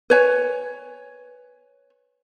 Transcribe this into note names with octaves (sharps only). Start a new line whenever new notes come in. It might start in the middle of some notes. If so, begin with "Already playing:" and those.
B4 C#5 G#5